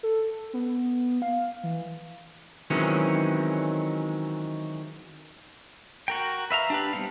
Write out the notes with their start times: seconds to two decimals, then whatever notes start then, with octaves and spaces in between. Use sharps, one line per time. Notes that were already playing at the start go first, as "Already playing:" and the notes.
0.03 A4
0.54 B3
1.22 F5
1.63 E3
2.70 D#3 E3 F#3 G#3 C4 C#4
6.08 F#4 A#4 G5
6.51 B4 E5 F5 A#5
6.70 D4 G4 B4
6.93 G3 B3 C4 F5